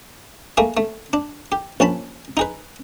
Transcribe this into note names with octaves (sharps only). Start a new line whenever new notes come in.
A3 A#3 G#4 G#5
A3
D4
G4
A#1 C#4 A5 B5
D#4 G#4 B4